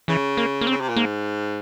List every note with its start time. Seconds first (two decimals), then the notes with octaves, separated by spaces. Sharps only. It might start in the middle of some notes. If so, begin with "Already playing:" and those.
0.08 C#3 E3
0.37 A#3
0.61 A#3
0.67 C4
0.71 C#3
0.81 C3
0.89 A#2
0.96 G#2 A#3